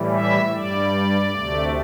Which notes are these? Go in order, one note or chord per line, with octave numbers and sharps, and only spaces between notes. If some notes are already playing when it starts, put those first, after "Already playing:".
Already playing: A2 E3 G3
E5
G2 G3 D5
D2 C3 A3